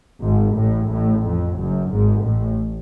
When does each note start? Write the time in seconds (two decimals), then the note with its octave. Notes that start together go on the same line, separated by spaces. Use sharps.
0.23 G#1 G#2
0.56 A1 A2
0.89 A1 A2
1.24 F2
1.57 F#1 F#2
1.90 G#1 G#2
2.24 A1 A2